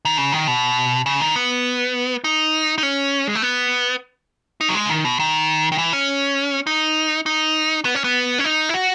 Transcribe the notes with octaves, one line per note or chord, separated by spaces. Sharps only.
D#3
C#3
D#3
B2
C#3
D#3
B3
D#4
D#4
C#4
G#3
A3
B3
D#4
F#3
G#3
C#3
D#3
B2
D#3
D#3
E3
C#4
D#4
D#4
B3
C#4
B3
C#4
D#4
E4
F#4